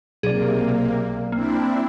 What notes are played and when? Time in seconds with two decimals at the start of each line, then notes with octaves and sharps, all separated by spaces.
0.23 B1 C3 A#3 G#4 D5
1.32 A#3 C4 D4 E4